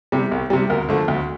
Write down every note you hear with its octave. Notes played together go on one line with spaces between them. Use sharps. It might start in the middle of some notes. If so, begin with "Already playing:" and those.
C3 G3
C2
C3 G3
D2 A#4
D3 F3 A3
D2